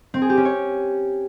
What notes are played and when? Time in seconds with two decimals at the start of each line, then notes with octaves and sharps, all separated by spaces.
0.14 C4
0.22 G#4
0.29 G4
0.37 C#4
0.45 C#5